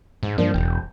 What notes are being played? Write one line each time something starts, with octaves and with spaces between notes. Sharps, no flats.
G#2
G2 F3 A#3 D4
E1 G5